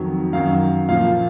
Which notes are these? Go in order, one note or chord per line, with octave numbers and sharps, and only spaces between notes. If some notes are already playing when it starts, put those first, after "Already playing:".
Already playing: F2 D#3 F#3
F#2 D#3 F#3 F5
A#2 F3 F5